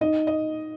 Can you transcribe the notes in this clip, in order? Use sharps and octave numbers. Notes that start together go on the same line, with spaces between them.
D#4 D#5
D#5